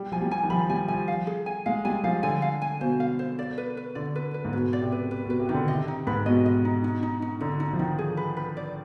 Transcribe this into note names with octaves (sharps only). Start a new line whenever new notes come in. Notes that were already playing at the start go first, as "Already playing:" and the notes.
Already playing: G3
F3 G#5
G3
G#5
D#3
F3 B5
G3 G#5
F3 G#5
F5
G#4
G#5
G#3 F5
G3 G#5
F3 F5
D3 G#5
F5
G#5
B2 C5
F5
C5
D5
B4
B4
D3 D5
B4
B4
G#2
B2 B4
D5
C3
B4
B4
B2 B4
C3
D#3 B4
D3
C3 D#5
D#4
G#2 B4
B2 D#5
D#5
D#4
D#4
D#4
D#4
D3 D#4
D#4
F3
D#3 D#4
G#4
B4
B4
D5